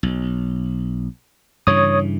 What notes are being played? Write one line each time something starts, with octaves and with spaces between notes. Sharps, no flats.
B1
G2 C#3 E3 C#5 D#6